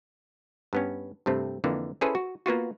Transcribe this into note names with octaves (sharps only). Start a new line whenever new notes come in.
G2 B3 C#4
G2 C3 A3 C4
F2 D3 E3 A#3
C#4 E4 G#4 A4 B4 C5
F#4
A#3 B3 F4 F#4